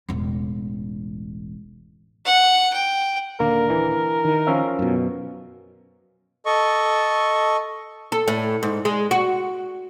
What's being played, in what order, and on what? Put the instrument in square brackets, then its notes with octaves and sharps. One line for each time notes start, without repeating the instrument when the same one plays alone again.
[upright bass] E1 A1
[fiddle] F#5
G5
[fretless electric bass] D#1 D3 [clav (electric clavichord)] A#3 [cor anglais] A#4
[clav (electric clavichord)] E3
[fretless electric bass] D#3
[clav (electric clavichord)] F3 C#4 E5
[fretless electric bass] F#2 B2
[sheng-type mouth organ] A4 D#5 C#6
[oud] A4
A2
G#2
G#3
F#4